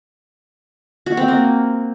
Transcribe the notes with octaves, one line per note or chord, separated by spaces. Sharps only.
F#4
C4
A#3